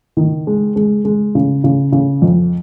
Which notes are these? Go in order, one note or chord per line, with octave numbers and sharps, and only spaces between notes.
D#3
G#3
G#3
G#3
C#3
C#3
C#3
F2